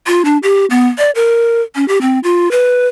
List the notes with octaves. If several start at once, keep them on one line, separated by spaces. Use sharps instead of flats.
F4
D4
G4
B3
D5
A#4
C#4
G4
C4
F4
B4